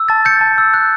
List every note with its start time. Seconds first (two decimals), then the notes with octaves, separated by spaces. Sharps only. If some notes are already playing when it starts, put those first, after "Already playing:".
Already playing: E6
0.09 A5 A6
0.25 G6 A6 C#7
0.41 A5
0.58 E6
0.74 F#6